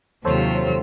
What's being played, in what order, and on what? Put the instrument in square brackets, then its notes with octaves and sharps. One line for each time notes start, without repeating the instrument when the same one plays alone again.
[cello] D#2 C3 [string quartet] F#3 F4 E6 [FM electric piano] A4 C5 C#5